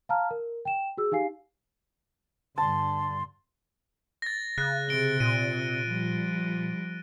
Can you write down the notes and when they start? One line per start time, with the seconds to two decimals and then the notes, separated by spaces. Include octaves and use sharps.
0.09 F5 A5 A#5 F6
0.31 A#4
0.65 G5 E7
0.97 F#4 G#4 E6
1.12 D#4 G4 F5 G#5 C7
2.58 G2 D3 A5 C6
4.22 A6 A#6
4.58 C#3 F#6
4.89 C3 D7 G7
5.20 A#2 D#7
5.87 F3 G3